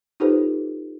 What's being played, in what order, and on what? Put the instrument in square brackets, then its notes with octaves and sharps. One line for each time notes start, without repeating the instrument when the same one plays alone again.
[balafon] D#4 F4 G4 A4 B4 C5